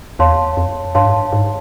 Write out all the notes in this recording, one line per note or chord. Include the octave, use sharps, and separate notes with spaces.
E2 C#5 F5 A5 C6
F2
G2 C#5 F5 A5 C6
G#2
G2
G#2